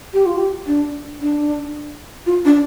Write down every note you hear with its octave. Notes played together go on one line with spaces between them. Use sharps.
G4
F4
G4
D4
D4
F4
D4